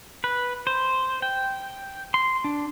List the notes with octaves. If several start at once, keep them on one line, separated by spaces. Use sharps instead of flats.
B4
C5
G5
C6
D4